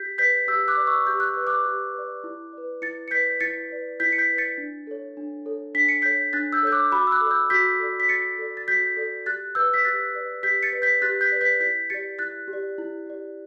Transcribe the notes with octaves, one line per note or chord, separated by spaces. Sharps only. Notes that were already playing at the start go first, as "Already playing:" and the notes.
Already playing: G4 G6 B6
B4 D5 G6 B6
G4 E6 G6
D6 F#6
B4 D5
C#6 E6
G4 G6
F#6
B4 D5 E6
D6 F#6
G4
B4 D5
E4
B4 D5
E4 A6 C#7
C#7
B4 D5 G6 B6
E4 A6 C#7
B4 D5
E4 G6 B6
C#7
G6 B6
B4 D5
A6 C#7
D4
A4 C#5
D4
A4 C#5
D4 B6
C#7
A4 C#5 G6 B6
D4 F#6 A6
E6 G6
A4 C#5 G6
D6 F#6
F#4 B5 D6
E6
D6 F#6
A4
D5 E6 G6
F#4 G6 B6
A4 D5
B6
F#4 A6 C#7
A4 D5
A6
F#4 G6 B6
A4 D5
G4 F#6 A6
B4 D5 E6 G6
B6
G4 F#6 A6
B4 D5
G4 G6 B6
A6 C#7
B4 D5
G6 B6
G4 F#6 A6
G6 B6
B4 D5
G6 B6
E4 G6 B6
G4 D5 A6 C#7
E4 F#6 A6
G4
D5
E4
G4 D5